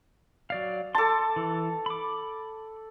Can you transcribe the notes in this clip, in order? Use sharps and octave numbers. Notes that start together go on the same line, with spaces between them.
F#3 D5 F5
A4 A5 C6 D6
E3
B5 D6